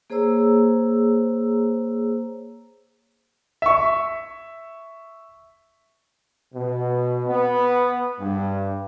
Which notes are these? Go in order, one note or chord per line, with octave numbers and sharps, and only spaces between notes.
A#3 G#4 C5 C#5 A#5 E6
E5 C#6
B2
B3
G2